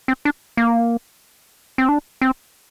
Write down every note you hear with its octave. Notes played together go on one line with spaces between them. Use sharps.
C4
D4
A#3
C4
D4
C4